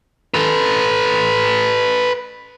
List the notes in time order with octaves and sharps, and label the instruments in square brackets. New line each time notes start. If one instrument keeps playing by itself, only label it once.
[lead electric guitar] A4 B4